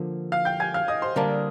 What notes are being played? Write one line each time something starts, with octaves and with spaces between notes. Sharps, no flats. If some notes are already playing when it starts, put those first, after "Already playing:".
Already playing: D3 F3 A#3
F5 F6
G5 G6
G#5 G#6
F5 F6
D#5 D#6
C5 C6
D3 G3 A#3 D4 A#4 A#5